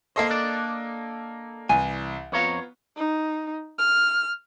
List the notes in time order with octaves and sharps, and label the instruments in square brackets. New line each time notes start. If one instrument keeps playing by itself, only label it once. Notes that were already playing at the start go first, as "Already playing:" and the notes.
[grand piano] A#3 A4 D#5 [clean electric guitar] C5
[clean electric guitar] D4 D5
[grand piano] C2 E3 [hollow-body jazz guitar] G#5
[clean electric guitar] F2 C#5 A#5 [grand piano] B3 F4
[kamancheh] D#4
F6